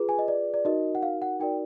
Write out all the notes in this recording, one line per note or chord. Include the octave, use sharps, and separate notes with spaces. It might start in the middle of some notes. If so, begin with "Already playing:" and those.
Already playing: F4 G#4 B4
G#5
D#5
D5
D5
D#4 F#4 A#4 D#5
F#5
F5
F#5
D#4 F#4 A#4 D5 G5